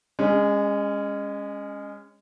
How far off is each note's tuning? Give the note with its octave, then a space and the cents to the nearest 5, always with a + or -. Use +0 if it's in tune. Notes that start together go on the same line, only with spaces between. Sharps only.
G#3 -25 C#4 +5